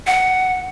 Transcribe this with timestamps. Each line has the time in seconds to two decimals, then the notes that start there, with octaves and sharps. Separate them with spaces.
0.07 F#5